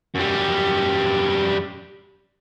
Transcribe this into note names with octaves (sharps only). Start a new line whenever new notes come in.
F#2 G3